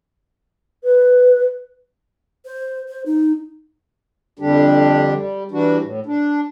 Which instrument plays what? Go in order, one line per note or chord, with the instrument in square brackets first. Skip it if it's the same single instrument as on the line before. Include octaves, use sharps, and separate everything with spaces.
[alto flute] B4
[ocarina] C5
C5
D#4
[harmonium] F2 D3 G3 D4 G4
G3
E3 G3 D4 F#4
A2
D4